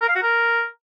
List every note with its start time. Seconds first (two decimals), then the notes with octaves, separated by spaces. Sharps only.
0.02 A#4
0.08 F5
0.15 F#4
0.22 A#4